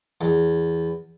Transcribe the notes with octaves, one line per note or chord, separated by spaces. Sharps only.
E2